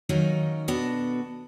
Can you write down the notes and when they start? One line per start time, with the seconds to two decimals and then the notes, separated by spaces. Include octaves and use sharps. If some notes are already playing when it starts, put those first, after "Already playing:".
0.09 D#3 F#3 A#3 C#4 D#4
0.68 B2 B3 D4 F#4 A4